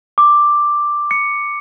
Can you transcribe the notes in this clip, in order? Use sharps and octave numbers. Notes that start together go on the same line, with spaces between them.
D6
C#7